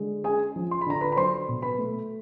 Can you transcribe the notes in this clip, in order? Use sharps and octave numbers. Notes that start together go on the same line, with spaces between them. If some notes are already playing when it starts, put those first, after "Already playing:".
Already playing: D3 G#3
C#4 G#4 G#5
F3
C6
B5
D3 A#5
B4 B5
B5
F#3 C5 C6
B2
B4 B5
A3